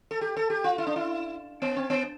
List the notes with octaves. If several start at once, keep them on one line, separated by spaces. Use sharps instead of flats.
A4
G4
A4
G4
F4
E4
D4
E4
B3
C4
B3